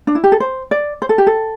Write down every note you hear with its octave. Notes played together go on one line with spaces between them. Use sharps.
D4
E4
G4
A4
C5
D5
C5
A4
G4
A4